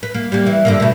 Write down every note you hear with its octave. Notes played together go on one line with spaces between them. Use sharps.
B4
A#3
G3 A#3
E3
G2 D3 A#3
B2 A3